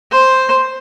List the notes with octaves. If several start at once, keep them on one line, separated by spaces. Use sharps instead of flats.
C5